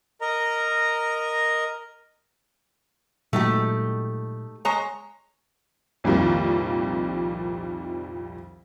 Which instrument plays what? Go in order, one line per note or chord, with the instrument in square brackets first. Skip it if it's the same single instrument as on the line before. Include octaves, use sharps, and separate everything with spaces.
[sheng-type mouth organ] A#4 D#5 A#5
[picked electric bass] A#2 F#3 G#3 [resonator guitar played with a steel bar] A3 D#4 G4
[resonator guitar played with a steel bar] G#3 C#5 A#5
[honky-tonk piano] C2 F2 A#2 D#3 G3